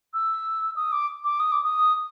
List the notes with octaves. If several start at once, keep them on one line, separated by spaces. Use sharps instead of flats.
E6
D#6
D6
D6
D#6
D6
D#6